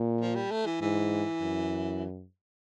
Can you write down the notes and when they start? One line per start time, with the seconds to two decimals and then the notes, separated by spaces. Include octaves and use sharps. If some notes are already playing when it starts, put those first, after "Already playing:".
Already playing: A#2
0.21 F3
0.35 G3
0.51 A3
0.66 E3
0.81 G#2 E3
1.41 F#2